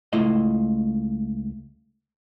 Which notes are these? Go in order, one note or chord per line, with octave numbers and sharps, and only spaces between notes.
C#2 A3 E4 F4 D#5